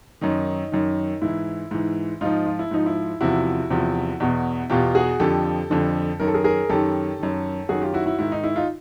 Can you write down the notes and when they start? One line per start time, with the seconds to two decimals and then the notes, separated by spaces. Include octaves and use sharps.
0.21 F#2 D#3 D#4
0.72 F#2 D#3
1.22 G#2 E3 E4
1.71 G#2 E3
2.21 G#2 F3 D#4 F4
2.46 F4
2.59 E4
2.71 G#2 F3 D#4
2.86 E4
3.20 E2 C3 F3 E4 F#4
3.70 E2 C3 F3
4.20 E2 B2
4.70 E2 B2 F4 G4
4.95 F#4 G#4
5.20 F2 D3 F3 G4 A4
5.70 F2 D3 F3
6.20 F#2 D#3 A#4
6.27 A4
6.34 G#4 A#4
6.44 G#4 A#4
6.70 F#2 D#3 G4 A4
7.19 F#2 D#3
7.69 F#2 D#3 F#4 G#4
7.82 F4 G4
7.94 E4 F#4
8.06 E4 F#4
8.19 G#2 D#3 E4
8.32 D#4
8.44 E4
8.56 D#4 F4